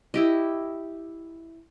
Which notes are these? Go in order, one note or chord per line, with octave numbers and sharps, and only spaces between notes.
E4 G4 D#5